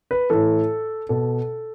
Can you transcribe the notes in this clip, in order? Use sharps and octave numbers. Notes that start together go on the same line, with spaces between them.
B4
A2 E3 A4
B2 A4